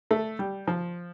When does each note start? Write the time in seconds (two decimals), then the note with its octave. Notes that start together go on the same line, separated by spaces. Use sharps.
0.11 A3
0.39 G3
0.68 F3